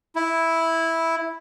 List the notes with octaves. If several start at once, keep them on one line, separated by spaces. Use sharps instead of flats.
E4